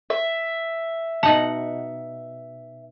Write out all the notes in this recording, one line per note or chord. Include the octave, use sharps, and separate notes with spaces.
E5
B2 D#4 F#5 A5